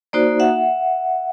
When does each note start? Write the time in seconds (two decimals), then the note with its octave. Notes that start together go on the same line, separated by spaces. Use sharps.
0.13 A#3 D#4 F#4 C5 D5
0.40 E5 F#5